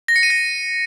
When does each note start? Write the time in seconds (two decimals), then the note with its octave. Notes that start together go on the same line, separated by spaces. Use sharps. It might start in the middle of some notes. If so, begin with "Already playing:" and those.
0.08 A#6
0.16 C#7
0.23 D#7
0.30 A#6